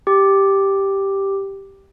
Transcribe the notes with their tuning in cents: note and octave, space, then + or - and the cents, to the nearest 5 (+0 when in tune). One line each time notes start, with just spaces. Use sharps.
G4 +0